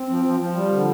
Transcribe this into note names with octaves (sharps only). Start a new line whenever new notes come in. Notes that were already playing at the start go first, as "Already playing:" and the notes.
Already playing: C4
F3
F3
F3
G3
D3